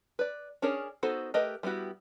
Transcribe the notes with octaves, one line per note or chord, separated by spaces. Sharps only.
B4 D5
C#4 D4 G#4 A#4 C#5
B3 D#4 F#4 A4 C5
A3 G4 A#4 B4 D#5
G3 B3 E4 F#4 G4